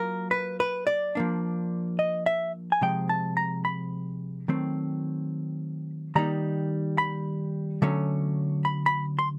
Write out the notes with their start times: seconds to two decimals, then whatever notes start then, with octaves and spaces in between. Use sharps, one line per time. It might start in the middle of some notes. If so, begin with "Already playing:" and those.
Already playing: F#3 A#3 F4 A#4
0.31 B4
0.60 B4
0.87 D5
1.15 F3 A#3 D4
1.99 D#5
2.26 E5
2.72 G#5
2.81 C3 F3 G#3 G5
3.09 A5
3.37 A#5
3.65 B5
4.48 D#3 F#3 A3 C4
6.15 D#3 G3 A#3 D#4 A#5
6.98 B5
7.82 D3 F#3 A3 C#4
8.65 B5
8.86 B5
9.19 C6